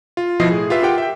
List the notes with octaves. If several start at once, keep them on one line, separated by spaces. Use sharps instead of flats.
F4
B2 F3 E4 D#5 C7
A2 G#4
F4 G4 B4 E5
F4 G4 A#4 F#5 G5
E5 G5